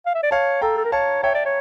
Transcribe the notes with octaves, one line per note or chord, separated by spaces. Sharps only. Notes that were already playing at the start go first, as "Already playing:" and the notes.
F5
E5
D5
C#5 F5 A5
A4 G5 A#5
A4
A#4
C#5 F5 A5
C#5 E5 G5
D5
C#5